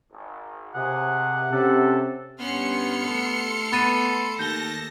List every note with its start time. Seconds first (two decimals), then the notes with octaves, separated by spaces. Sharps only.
0.12 G#1
0.74 D#2 C3 G#4 F#5
1.52 C3 C#4 G4 A4
2.40 G2 B3 C#4 C6 F6 C#7
3.04 A3 A4
3.72 B3 B5 A6 D#7
4.39 D#2 A5 G6 A#6 G7